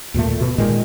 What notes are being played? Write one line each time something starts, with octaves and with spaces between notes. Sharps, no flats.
D#2 A#2 D#3 A3
B2
A#2 D#3 G#3